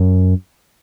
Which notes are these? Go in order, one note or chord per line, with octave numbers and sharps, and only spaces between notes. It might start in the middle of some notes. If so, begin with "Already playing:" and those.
Already playing: F#2